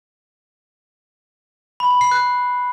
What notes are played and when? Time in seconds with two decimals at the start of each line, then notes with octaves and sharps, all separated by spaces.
1.80 B5
1.91 B5
2.01 C7
2.11 F#6